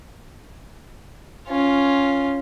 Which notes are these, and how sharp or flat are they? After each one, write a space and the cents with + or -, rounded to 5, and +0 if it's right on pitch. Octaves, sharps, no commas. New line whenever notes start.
C#4 +0 F4 +0